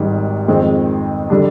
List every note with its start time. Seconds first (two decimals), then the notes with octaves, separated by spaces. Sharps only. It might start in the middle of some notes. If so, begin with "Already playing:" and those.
Already playing: G#1 G#2 G3
0.48 F2 D#3 G#3 C4
1.30 D3 G3 D4